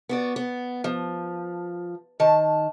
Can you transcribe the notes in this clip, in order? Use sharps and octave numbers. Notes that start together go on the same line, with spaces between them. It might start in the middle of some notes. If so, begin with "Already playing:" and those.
B3 F#4 D5
B3
F3
D#3 A5